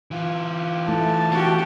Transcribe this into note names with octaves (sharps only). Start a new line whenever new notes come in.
E3 F4
A3 E4 A5
F#4 G4